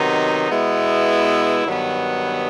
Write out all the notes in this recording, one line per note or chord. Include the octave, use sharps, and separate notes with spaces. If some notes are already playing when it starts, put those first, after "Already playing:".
Already playing: C3 D#3 F#3 B3 D#4
B2 G#3 B3 E4
G2 D#3 F#3 B3